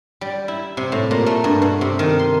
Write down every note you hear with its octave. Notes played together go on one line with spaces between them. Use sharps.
G3
E4
C3
A2
A#2
A3
G2
B2
C3
D#3
C6